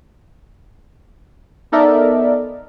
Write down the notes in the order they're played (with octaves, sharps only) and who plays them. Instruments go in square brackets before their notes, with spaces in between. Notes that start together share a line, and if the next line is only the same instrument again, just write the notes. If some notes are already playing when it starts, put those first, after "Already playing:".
[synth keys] B3 D#4 A4 A#4 D5 E5